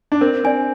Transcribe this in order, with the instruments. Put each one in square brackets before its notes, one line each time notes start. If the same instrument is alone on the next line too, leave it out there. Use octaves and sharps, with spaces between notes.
[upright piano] D4
[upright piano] C4 [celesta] A#4
[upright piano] C4 [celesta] D5 G#5